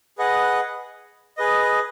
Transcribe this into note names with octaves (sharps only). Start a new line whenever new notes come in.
G#4 B4 D#5 F#5
G#4 B4 D#5